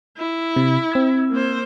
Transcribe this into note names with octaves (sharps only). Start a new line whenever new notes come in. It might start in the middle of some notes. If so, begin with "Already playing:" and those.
E4
C3
C4 E6 G#6
A#3 C5